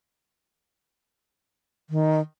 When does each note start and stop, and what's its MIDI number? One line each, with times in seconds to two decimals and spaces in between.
1.90 2.20 51